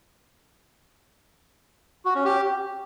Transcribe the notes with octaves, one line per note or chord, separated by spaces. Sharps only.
F#4
C#4
G4